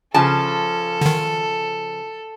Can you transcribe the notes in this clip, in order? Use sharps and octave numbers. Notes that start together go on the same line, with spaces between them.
C#3 F3 A4 A5
D3 D#3